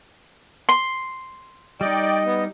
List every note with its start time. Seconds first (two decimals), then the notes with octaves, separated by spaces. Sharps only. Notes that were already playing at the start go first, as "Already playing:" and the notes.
0.69 C6
1.81 G3 D#4 D5 D#5 G5
2.26 B3